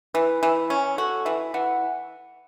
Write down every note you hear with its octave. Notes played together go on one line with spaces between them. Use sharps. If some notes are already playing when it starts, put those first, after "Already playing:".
E3 B4
E3
C#4
F#4 A4
E3 E5
E3 F#5